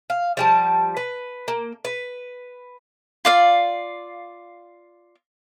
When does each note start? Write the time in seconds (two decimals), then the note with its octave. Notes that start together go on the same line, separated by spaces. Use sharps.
0.10 F5
0.37 F3 G3 A5
0.97 B4
1.48 A#3
1.85 B4
3.25 F4 D5 F5